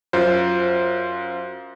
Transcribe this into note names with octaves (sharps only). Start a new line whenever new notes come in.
F#2 F4 C5